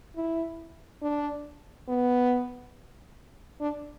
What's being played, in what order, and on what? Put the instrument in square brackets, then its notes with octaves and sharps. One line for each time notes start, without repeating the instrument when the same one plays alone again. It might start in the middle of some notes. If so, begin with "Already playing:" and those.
[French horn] E4
D4
B3
D4